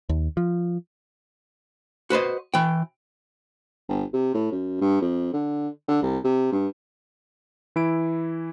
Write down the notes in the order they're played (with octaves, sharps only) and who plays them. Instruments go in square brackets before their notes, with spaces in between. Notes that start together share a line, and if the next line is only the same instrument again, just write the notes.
[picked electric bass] D#2
F3
[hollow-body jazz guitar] F#4 B4 C5 D#5
E3 G5
[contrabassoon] G1
C3
A2
F#2
G2
F2
D3
D3
C2
C3
G2
[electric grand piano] E3 E4 D7